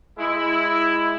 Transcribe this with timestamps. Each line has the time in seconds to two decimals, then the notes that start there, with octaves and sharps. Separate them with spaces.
0.19 G#3 E4